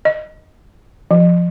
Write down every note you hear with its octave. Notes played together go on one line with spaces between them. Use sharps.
D#5
F3